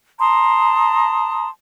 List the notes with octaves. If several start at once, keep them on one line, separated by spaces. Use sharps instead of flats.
A5 A#5 C6 D#6